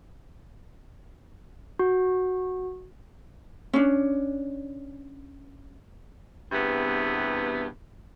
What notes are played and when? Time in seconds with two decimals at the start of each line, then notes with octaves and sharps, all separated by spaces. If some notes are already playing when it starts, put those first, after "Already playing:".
1.79 F#4
3.73 C#4 D4
6.51 E2 G2 C3 B3